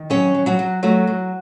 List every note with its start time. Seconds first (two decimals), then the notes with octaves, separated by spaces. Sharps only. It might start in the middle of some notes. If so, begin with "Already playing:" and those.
Already playing: D#3
0.10 F#3 C#4 C#5
0.34 F#3
0.46 F#3 F#4
0.59 F#3
0.83 F#3 A3 F#4
1.07 F#3